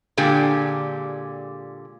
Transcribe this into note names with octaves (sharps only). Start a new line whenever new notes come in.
A#2 D3 G#3 G4